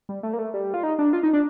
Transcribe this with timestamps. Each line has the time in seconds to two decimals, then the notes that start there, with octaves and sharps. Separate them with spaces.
0.09 G3
0.23 A3
0.33 A#3
0.39 A3
0.54 G3
0.74 F4
0.83 D#4
0.99 D4
1.13 F4
1.23 D#4
1.33 D4